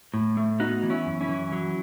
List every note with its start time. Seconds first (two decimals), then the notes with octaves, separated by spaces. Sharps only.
0.14 A2
0.37 A3
0.60 B3 D#4 F#4
0.83 E3
0.90 C#4 E4
1.06 F#2
1.21 C#4 E4
1.29 E3
1.52 F#3